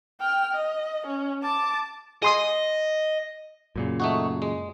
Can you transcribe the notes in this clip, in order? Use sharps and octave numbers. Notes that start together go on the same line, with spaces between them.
G5 F6
D#5
C#4
A5 D6
G#4 D#5 C6 D#6
F#2 A#2 C#3
A3 D#4 F#4
G#3